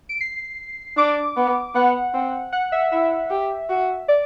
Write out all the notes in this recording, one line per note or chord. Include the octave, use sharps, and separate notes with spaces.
D7
C7
D4 D6
B3
B3 F#5
C4
F#5
E5
E4 E5
G4
F#4
D5